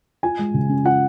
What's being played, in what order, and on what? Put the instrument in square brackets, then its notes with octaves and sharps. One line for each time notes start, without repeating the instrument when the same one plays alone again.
[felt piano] F4 [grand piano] G#5
[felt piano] G#3
C#3
C#4
[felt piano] F4 [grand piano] F#5